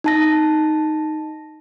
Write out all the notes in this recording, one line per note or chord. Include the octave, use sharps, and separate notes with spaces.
D#4 A5 A#6